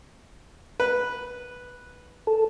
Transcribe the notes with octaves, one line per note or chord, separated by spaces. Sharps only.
B4
A4